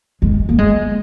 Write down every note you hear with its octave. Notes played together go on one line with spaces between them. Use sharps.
G#3
A#3
G#3